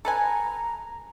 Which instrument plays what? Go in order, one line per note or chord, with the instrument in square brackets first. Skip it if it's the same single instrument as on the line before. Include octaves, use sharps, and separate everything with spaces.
[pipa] A4 B4 G#5 [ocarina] A#5